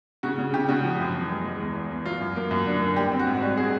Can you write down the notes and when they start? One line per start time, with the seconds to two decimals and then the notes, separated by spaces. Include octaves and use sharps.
0.23 C#3 F#4
0.39 C#3
0.53 C#3 G4
0.69 C#3 F#4
0.84 F3
0.99 F#2
1.15 E2
1.30 G#3
1.45 G#3
1.60 E2
1.75 E2
1.90 E2
2.06 F#3 F4
2.21 F#2
2.36 A#3
2.51 F#2
2.66 D3
2.82 A#3
2.96 G3 G4
3.12 C4
3.19 F#4
3.27 G#2
3.42 G3 F#4
3.57 C4 G#4